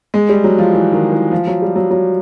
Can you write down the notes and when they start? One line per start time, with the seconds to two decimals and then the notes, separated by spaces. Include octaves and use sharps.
0.14 G#3
0.29 G3
0.44 F#3
0.58 F3
0.73 E3
0.92 D#3
1.12 E3
1.31 F3
1.47 F#3
1.62 G3
1.76 F#3
1.91 F#3